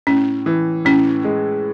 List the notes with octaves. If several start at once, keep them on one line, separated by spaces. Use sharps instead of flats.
A2 C#4
E3
A2 C#4
G#3